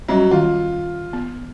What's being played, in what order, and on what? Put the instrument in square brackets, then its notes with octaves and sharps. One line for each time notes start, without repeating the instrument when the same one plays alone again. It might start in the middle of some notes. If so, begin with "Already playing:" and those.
[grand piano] F#3 [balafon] G3 C#4 D#5
[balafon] D#3 [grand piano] F4
[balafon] B3